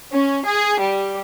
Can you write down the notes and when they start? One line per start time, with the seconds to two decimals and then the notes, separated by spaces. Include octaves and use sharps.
0.12 C#4
0.43 G#4
0.79 G3